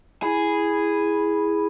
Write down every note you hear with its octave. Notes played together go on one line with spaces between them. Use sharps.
E4 G#4